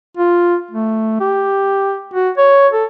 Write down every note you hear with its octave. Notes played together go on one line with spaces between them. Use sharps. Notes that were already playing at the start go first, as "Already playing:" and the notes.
F4
A3
G4
F#4
C#5
A4